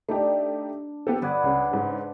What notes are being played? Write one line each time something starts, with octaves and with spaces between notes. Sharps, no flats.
A3 D4 D#4 G4
B3 G4 A4
G1 B4 D5 F#5 D#6 G#6
C#2 C#3
G#2 C#3